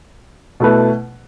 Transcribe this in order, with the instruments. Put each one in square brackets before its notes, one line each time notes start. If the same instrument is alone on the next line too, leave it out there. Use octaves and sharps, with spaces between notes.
[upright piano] B2 A3 E4 B4